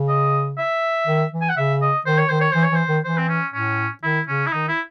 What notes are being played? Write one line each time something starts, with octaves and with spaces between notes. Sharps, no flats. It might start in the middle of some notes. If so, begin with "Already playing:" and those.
Already playing: C#3
D#5
E5
D#3
E3
G#5
F#5
C#3 E5
D#5
D#3 C5
C#5
D#3 C5
C#5
E3 C5
C#5
E3 C5
D#3
E3 C5
C4
C#4
A2 C#4
D#3 E4
C#3 C#4
E4
D#3 D#4
E4